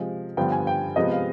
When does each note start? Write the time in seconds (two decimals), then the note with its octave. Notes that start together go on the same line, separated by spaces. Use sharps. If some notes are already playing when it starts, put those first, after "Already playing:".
Already playing: C3 F3 G#3
0.37 G2 D3 F3 B3 G5
0.52 G#5
0.67 G5
0.96 C3 F3 G#3 B3 D#5
1.12 F5